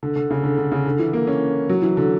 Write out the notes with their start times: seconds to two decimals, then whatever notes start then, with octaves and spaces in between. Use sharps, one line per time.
0.03 D3
0.16 D3
0.30 C#3
0.44 D3
0.58 D3
0.72 C#3
0.86 D3
0.99 E3
1.13 A#3
1.27 C#4
1.69 F#3
1.82 E3
1.97 D3